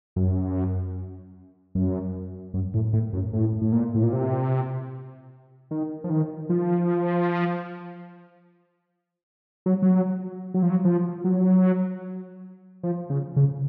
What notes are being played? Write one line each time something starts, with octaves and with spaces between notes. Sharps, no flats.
F#2
F#2
F#2
A2
A2
F#2
A2
A2
A#2
A2
A#2
C3
D#3
F3
D#3
F3
F#3
F#3
F#3
F3
F#3
F3
F#3
F3
C#3
C#3